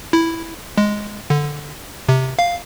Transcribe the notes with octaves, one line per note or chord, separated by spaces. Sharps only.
E4
G#3
D3
C3
F5